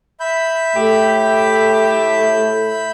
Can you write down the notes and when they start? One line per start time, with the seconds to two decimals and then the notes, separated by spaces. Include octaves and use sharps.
0.20 E5 B5 G6
0.76 A2 A3 G4